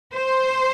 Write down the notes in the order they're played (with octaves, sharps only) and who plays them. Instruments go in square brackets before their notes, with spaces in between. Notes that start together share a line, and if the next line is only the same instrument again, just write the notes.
[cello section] C5